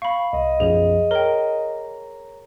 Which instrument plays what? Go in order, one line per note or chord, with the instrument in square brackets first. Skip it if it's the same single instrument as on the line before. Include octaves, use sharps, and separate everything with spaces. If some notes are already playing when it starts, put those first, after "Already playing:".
[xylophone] F5 B5 [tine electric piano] C#6
[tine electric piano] C2 [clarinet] D#5
[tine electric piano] B1 F#2 F3 [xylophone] G#4 F7
[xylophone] A#4 G5 [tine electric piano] C#5 A#5